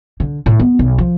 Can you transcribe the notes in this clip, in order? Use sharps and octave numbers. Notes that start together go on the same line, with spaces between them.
D3
A2
B3
B1
F3